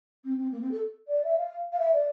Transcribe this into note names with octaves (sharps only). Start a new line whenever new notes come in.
C4
C4
A#3
C4
A4
D5
E5
F5
F5
E5
D5